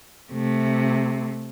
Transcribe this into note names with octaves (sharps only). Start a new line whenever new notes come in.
C3 A3